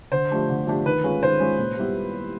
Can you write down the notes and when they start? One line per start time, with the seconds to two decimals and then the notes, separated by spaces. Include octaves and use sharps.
0.11 D3 C5
0.31 F3 A3 D4 G4
0.49 D3
0.67 F3 A3 D4 G4
0.86 D#3 B4
1.04 G#3 C#4 F4 G#4
1.22 D#3 C5
1.40 G#3 C#4 F4 G#4
1.58 A#2
1.77 G3 B3 E4 G4